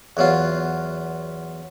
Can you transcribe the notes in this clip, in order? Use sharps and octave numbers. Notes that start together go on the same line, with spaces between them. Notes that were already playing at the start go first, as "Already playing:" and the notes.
E2 F#3 F4